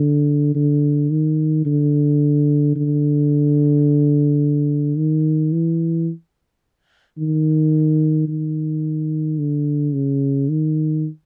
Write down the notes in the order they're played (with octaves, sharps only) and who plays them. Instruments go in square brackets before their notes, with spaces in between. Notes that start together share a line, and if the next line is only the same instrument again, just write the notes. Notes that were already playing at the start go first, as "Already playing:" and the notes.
Already playing: [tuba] D3
D3
D#3
D3
D3
D#3
E3
D#3
D#3
D3
C#3
D#3